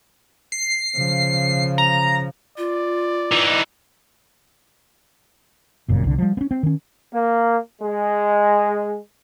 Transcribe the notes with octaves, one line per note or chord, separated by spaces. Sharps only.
C7
C#3 F3
A#5
F4 D5
E3 D#4
G1 F#2 A#2 C#3
C2 D3
F3 G3
B3 C#4
C4
D#3 C#4
A#3
G#3